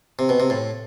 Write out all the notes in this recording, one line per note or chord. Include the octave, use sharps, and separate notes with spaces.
C3
B2
C3
A2